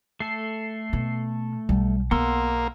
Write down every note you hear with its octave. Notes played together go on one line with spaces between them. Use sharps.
A3 A4 C7
B2
B1 G3
A#3 B3 F#5 C6 E6